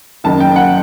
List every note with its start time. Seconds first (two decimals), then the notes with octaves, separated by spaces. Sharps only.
0.24 F#1 F#2 D#3 A5
0.40 G5
0.56 F#5